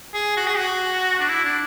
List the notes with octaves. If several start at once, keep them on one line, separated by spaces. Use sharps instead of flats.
G#4
F#4
G#4
F#4
D4
E4
D4